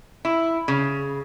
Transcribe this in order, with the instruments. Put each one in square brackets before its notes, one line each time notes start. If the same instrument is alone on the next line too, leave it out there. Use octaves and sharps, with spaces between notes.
[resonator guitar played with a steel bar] E4
C#3